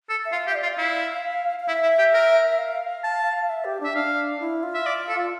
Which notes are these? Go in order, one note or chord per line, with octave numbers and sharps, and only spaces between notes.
A4
E5
F4 F5
G4
E5
D5
F4
F5
E4
F5
E4 E5
E4
G4
A#4
F5
A5
E5
G4
D4 E5
D4 F5
E4
F4
E5
D5
A4